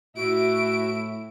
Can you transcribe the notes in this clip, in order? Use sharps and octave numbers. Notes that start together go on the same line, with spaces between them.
A2 E4 F#4 D7